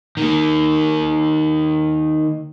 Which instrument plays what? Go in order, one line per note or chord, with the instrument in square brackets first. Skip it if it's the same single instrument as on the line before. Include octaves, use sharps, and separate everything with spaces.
[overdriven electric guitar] D#3 A#3